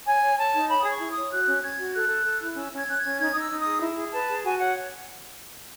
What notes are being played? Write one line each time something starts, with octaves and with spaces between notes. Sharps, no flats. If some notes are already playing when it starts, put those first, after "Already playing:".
C#5 G#5
C#5
C#5 A5
D#4
C#5 B5
G#4 D#6
C#6
E4
D#6
C#5
F#4 F#6
C#4
C#4 G#6
F#4
A4 F#6
A4
A4
E4
C#4 E6
C#4 G#6
C#4 F#6
C#4 G#6
D#4 G#6
D#4 D#6
E6
D#4
D#6
G#4
E4
G#4
B4 A5
G#4
F#4 G#5
C#5 F#5